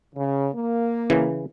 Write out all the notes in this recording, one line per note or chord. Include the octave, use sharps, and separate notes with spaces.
C#3
A#3
C#3 E3